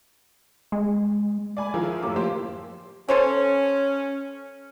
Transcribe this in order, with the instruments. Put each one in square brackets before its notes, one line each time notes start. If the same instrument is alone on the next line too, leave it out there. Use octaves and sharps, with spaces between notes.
[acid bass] G#3
[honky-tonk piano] D5 G#5 B5
D#3 F3 E4 F4 G#4 A#4
F#2 A2 G4 D6
F3 A#3 G4 C5
[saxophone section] C#4 [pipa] A4 C5 C#5